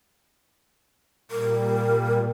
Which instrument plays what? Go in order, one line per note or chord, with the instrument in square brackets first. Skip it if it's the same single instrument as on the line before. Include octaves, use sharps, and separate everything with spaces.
[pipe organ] A#2 G3 [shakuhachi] A#4